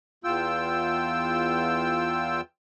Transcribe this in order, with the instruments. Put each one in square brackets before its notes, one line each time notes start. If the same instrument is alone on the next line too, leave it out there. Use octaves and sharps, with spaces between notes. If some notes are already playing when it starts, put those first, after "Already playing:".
[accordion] E2 F4 G5 E6